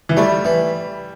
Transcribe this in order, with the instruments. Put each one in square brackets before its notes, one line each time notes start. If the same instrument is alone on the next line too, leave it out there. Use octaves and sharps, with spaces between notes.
[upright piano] E3
[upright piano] G3 [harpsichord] A3
[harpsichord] E3